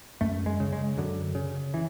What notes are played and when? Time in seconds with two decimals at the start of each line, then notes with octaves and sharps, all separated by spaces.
0.21 F#2 A3
0.46 G#3
0.60 C#3
0.73 G#3
0.97 F#2 D3
1.35 C#3
1.74 E3